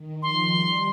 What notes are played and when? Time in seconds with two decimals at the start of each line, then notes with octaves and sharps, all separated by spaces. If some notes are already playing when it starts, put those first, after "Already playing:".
Already playing: D#3
0.23 F3 C6
0.53 G3